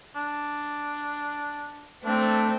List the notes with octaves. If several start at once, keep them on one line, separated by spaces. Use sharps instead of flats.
D4
A3 C4 D4